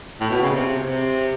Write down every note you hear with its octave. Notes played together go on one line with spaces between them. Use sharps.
A2
B2
C#3
C3
C3